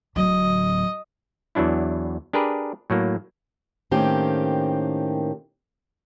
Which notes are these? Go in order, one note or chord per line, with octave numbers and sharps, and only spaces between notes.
D1 F#3 D#5
E2 E3 F#3 D4 E4
D4 G4 G#4 A#4 B4
A2 F#3 A#3
A2 D#3 A#3 C4 C#4 G4